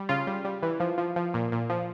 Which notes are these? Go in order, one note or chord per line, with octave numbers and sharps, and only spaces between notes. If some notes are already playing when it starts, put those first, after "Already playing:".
Already playing: G3
C#3 F4
G3
G3
E3
F3
F3
F3
A#2
A#2
F3